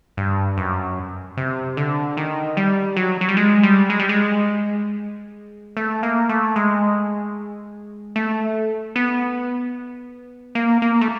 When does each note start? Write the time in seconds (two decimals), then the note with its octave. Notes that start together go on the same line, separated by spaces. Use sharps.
0.17 G2
0.58 F#2
1.37 C3
1.77 D3
2.17 D#3
2.57 G3
2.97 F#3
3.21 F#3
3.28 G3
3.37 G#3
3.63 G3
3.90 G#3
3.99 G3
4.09 G#3
5.77 A3
6.03 A#3
6.29 A3
6.56 G#3
8.16 A3
8.96 B3
10.55 A#3
10.82 A#3
11.01 A3